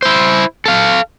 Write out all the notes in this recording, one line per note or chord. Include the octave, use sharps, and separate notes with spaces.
E4 C5
A4 F5